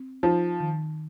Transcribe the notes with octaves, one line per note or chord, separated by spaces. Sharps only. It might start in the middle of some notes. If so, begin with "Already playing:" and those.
Already playing: C4
F3 D#4
D#3